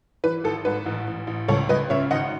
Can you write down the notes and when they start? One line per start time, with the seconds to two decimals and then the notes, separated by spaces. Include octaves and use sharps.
0.24 E3 B4
0.44 G#1 A4
0.65 G#2 B4
0.86 A1
1.07 A1
1.27 A1
1.48 C#2 A4 C#5
1.69 C#2 B4 D#5
1.90 C#3 C#5 E5
2.11 G#1 D#5 F#5